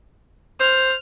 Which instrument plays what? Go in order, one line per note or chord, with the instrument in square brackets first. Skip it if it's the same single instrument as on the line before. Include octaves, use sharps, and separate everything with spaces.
[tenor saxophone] C5 [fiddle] F6